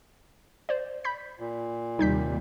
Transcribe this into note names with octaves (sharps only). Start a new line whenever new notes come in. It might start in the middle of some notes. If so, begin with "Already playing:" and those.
C5 D5
B5 G6 B6
A#2
D#2 C3 G3 D#4 G6 B6